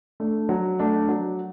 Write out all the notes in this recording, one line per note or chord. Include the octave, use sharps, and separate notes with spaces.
A3 D4
F#3
A3 D4
F#3